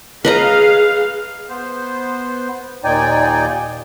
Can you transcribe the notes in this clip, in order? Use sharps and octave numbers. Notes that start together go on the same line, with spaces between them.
G#4 B4 D#5 F5 A#5
B3 C5
D#2 A#2 D#4 D5 G5 G#5